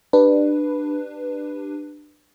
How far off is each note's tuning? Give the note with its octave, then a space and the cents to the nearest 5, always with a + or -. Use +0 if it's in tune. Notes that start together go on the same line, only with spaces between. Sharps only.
D4 +20 G4 +0 B4 +0